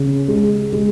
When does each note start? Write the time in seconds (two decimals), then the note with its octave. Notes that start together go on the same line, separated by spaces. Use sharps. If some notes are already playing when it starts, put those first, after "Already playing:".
Already playing: C#3
0.28 G#3
0.73 G#3